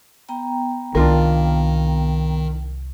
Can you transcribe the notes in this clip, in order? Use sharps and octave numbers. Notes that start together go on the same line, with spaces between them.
B3 G5 A#5
C2 D#3 D4 F4 A#4